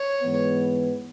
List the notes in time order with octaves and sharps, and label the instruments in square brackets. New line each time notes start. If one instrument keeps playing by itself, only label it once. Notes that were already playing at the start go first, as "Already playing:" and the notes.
Already playing: [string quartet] C#5
[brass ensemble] G#2 E3 G#3 B3